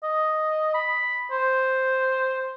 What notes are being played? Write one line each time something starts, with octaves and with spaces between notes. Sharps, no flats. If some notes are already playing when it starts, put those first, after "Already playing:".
D#5
B5
C5